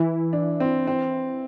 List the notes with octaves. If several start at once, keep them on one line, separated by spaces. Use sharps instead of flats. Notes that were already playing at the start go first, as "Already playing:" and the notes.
Already playing: E3 E4
D4
C4
C4